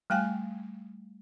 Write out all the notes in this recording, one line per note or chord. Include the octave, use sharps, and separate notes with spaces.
G3 A3 F5 G5 G#5